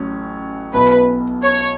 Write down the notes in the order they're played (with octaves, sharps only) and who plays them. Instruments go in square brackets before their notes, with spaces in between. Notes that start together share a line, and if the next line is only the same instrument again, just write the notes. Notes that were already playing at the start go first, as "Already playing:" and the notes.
Already playing: [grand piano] A1 A2 F#3 C#4
[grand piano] B1 B2 B3 E4 [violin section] B4
[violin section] C#5